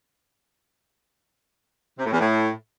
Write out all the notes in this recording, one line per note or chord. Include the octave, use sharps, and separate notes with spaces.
C3
A2
E2
A2